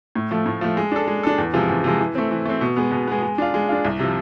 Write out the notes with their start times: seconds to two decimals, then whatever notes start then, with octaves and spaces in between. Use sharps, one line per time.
0.15 A2
0.31 F3 A3
0.46 A2
0.61 F3 A3
0.77 G#3
0.92 D4 A4
1.08 G#3
1.23 D4 A4
1.38 E2
1.54 C3 F3 G#3
1.69 E2
1.84 C3 F3 G#3
2.00 E3
2.15 A3 C4
2.31 E3
2.45 A3 C4
2.61 B2
2.77 G#3 B3
2.92 B2
3.07 G#3 B3
3.22 G#3
3.38 D4 F4
3.54 G#3
3.69 D4 F4
3.85 C2
3.99 C3 F3